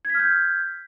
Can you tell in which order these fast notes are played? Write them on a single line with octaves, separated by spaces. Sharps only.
G#6 B6 F6 G6